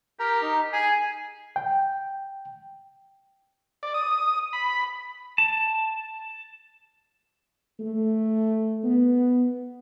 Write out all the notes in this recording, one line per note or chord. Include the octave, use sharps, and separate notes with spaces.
G4 A#4 A#5
D#4
G#4 G#5
G5
D5
D#6
B5
A5
A3
B3